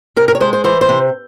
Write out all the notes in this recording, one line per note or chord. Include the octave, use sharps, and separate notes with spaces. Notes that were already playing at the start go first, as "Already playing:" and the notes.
C3 A#4
A#4
C#5
G#3 C5
C5
E3 C5
C5
C3